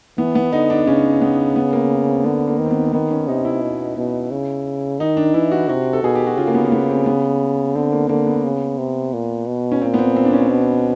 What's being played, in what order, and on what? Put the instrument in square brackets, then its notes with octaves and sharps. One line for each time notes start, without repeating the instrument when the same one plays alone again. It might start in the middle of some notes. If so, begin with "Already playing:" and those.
[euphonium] E3 [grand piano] B3
[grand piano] B3
[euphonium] D3 [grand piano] D#4
[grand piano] D4
[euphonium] C#3 [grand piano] C#4
[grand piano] B3
B3
A#3
C4
[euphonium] D3 [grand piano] B3
[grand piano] A#3
[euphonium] D#3
[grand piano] C4
B3
C4
[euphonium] D#3 [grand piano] B3
[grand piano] C#4
[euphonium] C3 [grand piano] D#4
[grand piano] E4
[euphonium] B2
B2
C#3
[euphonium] D#3 [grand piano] D#4
[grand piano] D4
[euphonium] E3 [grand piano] E4
[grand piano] F#4
[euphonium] C3 [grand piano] F#4
[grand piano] A4
[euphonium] B2 [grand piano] G#4
[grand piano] G4
F#4
[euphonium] C#3 [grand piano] F4
[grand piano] A#3
B3
B3
C4
B3
[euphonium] D3 [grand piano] C4
[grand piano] A#3
[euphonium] D3 [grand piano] A#3
[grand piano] B3
[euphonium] C#3
C3
A#2
B2
[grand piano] C#4
[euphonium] A#2 [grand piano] C4
[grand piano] B3
C4
C4
D4
C#4
[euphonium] B2